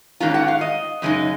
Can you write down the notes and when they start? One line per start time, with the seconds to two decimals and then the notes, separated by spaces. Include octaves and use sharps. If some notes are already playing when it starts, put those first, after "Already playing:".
0.20 G#2 D#3 G#3 C#4 F4 A#5
0.34 F#5
0.48 F5
0.61 D#5
1.02 F#2 C#3 G#3 D#4